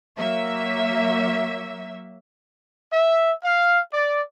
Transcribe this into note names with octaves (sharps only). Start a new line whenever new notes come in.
F#3 A#3 E5
E5
F5
D5